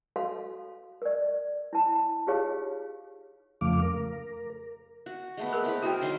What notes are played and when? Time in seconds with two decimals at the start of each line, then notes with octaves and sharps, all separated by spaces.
0.16 F#4 A4 F5 C6
1.02 A#4 D5
1.73 E4 A5
2.27 D#4 F4 G4 G#4 C#5 F5
3.61 F2 C#3 F3 A3 F5 D6
3.82 A#4
5.06 F#4
5.37 G#3 A3 B3
5.53 G#4 A#4
5.64 C4 E4 B4
5.83 E4 F#4 A#4 G5
6.01 D#3 F#3 C5